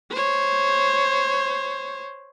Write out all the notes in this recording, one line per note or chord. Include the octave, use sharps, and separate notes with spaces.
C5 C#5